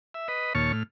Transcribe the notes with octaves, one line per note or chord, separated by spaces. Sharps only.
E5
B4 D#5
D#2 A#2 C#5 A5 C#6 F6
A2 F6